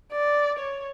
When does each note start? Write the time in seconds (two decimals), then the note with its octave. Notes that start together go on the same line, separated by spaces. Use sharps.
0.12 D5
0.59 C#5